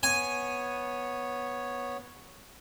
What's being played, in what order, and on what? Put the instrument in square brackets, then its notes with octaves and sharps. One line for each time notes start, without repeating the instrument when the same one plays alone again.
[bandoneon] B3 C#5 [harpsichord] G#5